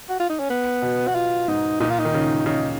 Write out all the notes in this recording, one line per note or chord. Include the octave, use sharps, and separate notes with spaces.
F#4
F4
D#4
C#4
B3
B2
F#4
F4
G#2 D#4
A#2 D#4
F4
D#4
D#3
C#3
C#3 D#4